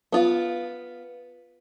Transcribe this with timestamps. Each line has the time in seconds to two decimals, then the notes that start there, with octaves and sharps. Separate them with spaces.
0.12 B3 F4